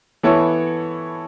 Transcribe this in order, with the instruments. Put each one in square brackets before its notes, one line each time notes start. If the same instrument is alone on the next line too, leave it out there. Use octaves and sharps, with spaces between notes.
[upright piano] E3 B3 E4 A4 C#5